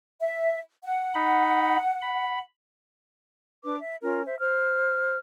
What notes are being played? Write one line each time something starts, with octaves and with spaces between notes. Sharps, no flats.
E5
F#5
D#4 B5
B5
D4 B4 D6
E5
C#4 F4 A#4
C5 E5
C5 F6